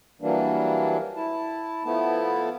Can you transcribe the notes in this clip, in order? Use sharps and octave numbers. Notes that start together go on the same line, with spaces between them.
E3 F#3 G3 A#3 D4
E4 A5
F3 A3 B3 E4 A5